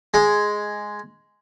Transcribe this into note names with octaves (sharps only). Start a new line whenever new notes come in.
G#3